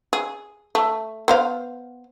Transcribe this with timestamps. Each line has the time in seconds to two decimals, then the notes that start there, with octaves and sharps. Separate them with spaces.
0.13 G#4
0.75 A3
1.28 B3 C5 F5